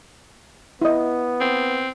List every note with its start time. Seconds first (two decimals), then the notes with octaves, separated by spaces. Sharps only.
0.81 B3 E4 D#5
1.40 C4